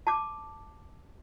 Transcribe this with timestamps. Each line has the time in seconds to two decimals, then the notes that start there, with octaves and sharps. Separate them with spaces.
0.07 A5 D6